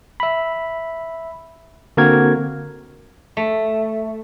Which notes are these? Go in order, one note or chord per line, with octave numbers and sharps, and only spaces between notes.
E5 B5
D3 A#3 C4 F#4 A#4 G#6
A3